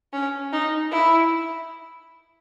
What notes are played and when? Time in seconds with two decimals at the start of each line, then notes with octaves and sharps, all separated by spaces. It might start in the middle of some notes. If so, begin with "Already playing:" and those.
0.13 C#4
0.53 D#4
0.92 E4